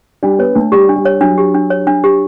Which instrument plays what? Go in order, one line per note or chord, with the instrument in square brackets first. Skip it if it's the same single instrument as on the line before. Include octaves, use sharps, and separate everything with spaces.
[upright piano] G3 [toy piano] D4
[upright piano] B3 [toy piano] C#5
[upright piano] A3 [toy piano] D4
[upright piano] G3 [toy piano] G4
[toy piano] D4
[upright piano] G3
[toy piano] C#5
[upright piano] F#3 [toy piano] D4
[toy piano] G4
D4
C#5
D4
G4